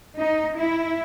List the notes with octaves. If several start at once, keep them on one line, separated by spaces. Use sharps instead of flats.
D#4
E4